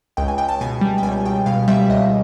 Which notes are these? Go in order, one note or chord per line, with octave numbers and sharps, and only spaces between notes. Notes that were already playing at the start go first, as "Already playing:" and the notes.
C#2 G5
G#5
C#2 G5
A5
B2 G#5
G3
G5
C#2 G#5
C#2 G5
B2 F5
G3 E5
C#2 D#5